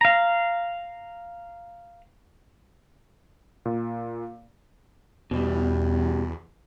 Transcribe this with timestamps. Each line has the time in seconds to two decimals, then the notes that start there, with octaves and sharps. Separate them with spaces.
0.01 F5 A#5
3.65 A#2
5.31 E2 B2 G3